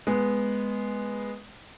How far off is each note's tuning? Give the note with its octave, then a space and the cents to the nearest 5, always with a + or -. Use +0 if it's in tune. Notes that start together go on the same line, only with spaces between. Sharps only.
G#3 +0 B3 -5